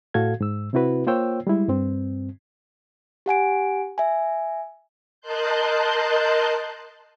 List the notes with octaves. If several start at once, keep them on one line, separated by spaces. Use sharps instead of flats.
A2 F#4 A4 F5 G#6
G#2 E6
C3 C4 E4 F#4 B4
A#3 F4 C5 C#5 G5 E6
G3 G#3 E4
G2 C4
G4 F#5 G#5 D7
E5 G#5
A#4 D#5 A5 C6 F#6 G6